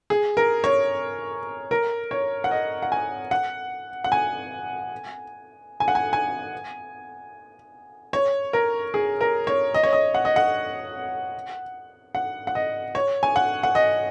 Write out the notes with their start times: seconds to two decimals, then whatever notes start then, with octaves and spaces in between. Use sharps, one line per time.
0.10 G#4
0.37 A#4
0.64 C#5
1.71 A#4
2.11 C#5
2.44 F#5
2.51 D#5
2.82 F#5
2.92 G#5
3.31 F#5
4.04 F#5
4.12 G#5
5.80 G#5
5.88 F#5
5.95 G#5
6.13 G#5
8.13 C#5
8.53 A#4
8.94 G#4
9.21 A#4
9.47 C#5
9.74 D#5
9.83 C#5
9.93 D#5
10.15 F#5
10.25 D#5
10.36 F#5
12.15 F#5
12.47 F#5
12.55 D#5
12.95 C#5
13.23 G#5
13.36 F#5
13.63 F#5
13.75 D#5